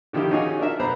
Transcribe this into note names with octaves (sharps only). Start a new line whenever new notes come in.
D3 D#3 F3 E4 G4
C#4 D#4 F4 F#4 G#4 D#5
D4 A#4 E5
B1 B3 C5 A#5 B5